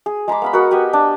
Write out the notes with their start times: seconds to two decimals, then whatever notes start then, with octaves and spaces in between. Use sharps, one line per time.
0.06 G#4
0.28 G#3 A#5 B5 D6
0.42 B3 F5 B5
0.53 F#4 A#4 D#5 F#5
0.71 B3 G4 G5 G#5
0.93 D4